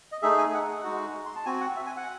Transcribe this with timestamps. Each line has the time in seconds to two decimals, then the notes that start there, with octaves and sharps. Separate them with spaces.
0.12 D#5
0.22 A3 D#4 G#4 E5
0.38 G#5
0.54 F#5
0.68 F#5
0.83 G#3 D#4 F#4
1.26 C6
1.36 A5
1.46 C4 F#4 G#5
1.61 F#5
1.76 E5
1.86 G#5
1.97 F#5